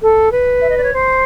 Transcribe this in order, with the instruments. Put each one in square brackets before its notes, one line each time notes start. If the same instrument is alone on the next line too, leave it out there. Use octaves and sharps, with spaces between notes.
[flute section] A4
B4
E5
D#5
D5
C#5
C5